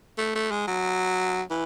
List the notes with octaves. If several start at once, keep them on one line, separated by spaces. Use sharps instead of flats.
A3
A3
G#3
F#3
E3